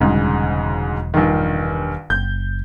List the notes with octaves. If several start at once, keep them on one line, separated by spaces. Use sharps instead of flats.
E1 D2 G#2 C#3 G3
A#1 G2 D#3
F#1 G6